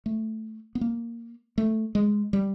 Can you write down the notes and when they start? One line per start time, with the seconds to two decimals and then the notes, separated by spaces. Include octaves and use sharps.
0.06 A3
0.75 B3
0.81 A#3
1.58 A3
1.95 G#3
2.33 G3